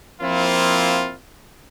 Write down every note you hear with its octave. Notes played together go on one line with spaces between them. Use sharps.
F3 A#3 C4 E4 F4